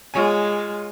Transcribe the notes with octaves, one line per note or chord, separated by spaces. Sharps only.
G#3 F4 C#5 G#5